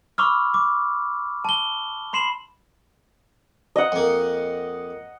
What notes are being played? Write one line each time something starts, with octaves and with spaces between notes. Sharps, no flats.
B5 C#6 D6 E6 F6
D6
A5 G7
B5 C6 C7 E7 F#7
D#5 F#5
F2 A#3